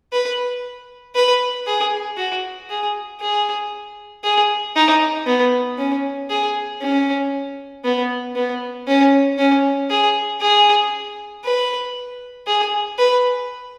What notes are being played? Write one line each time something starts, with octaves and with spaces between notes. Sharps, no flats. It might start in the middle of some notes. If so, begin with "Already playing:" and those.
B4
B4
G#4
F#4
G#4
G#4
G#4
D#4
B3
C#4
G#4
C#4
B3
B3
C#4
C#4
G#4
G#4
B4
G#4
B4